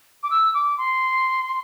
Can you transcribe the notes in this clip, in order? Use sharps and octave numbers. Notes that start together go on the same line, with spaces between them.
D6
E6
D6
C6